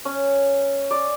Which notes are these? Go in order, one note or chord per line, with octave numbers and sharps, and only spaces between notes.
C#4
D5